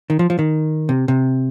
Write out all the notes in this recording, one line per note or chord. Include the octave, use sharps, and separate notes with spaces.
D#3
F3
F3
D#3
C3
C3